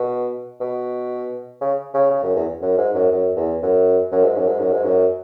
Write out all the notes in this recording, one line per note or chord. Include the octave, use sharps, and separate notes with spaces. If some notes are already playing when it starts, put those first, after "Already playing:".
Already playing: B2
B2
C#3
C#3
C#3
F#2
E2
F#2
G#2
F#2
F#2
E2
F#2
F#2
G#2
F#2
G#2
F#2
G#2
F#2